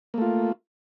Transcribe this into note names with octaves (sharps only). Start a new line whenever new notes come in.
A3 A#3 F4